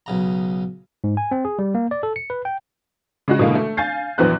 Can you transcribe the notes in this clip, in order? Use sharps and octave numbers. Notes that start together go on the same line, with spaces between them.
B1 C#3 A#5
G#2
G#5
C4
G#4
G3
A#3
D5
A4
C#7
B4
G5
C#3 G#3 F#4
B2 D3 E3 G#3 A#3
A3
F5 G#5 G6 A6 C7
A#1 E2 F#3 B3 C5 F#6